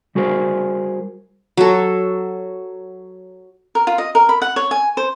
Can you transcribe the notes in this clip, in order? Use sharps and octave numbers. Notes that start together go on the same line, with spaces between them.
G3 F#4 G#4 A#4 C5
F#3 A4
A#4
F4
D#5
A#4
B5
F#5
C#5
G#5
C5